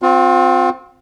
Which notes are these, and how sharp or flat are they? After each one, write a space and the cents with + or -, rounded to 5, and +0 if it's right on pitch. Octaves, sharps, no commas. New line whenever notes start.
C4 -10 F4 +35